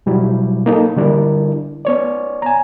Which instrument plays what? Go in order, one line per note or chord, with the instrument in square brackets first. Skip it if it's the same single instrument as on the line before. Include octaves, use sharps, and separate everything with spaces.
[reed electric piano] B2 F#3 G3 E4
A#3 D#4 A4
D3 G3 D4 E4 A#4
B3 C#5 D5
G#5 A#5